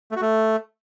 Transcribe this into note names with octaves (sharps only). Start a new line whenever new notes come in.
A3
F#4
A3